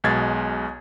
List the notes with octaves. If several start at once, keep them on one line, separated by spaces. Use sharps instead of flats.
B1 B2 G#3 G#6 A6